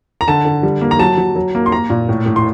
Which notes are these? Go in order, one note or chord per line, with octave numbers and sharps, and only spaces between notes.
A#5
D3 A5
D3
G3
A#3
A#5
F#3 A5
F#3
F#3
A#3
C6
A#3 A#5
A#2
A2
A2
C6